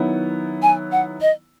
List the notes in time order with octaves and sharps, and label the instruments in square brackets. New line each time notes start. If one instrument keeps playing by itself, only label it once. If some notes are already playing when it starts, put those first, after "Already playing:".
Already playing: [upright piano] D#3 F#3 B3 E4
[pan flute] G#5
F#5
D#5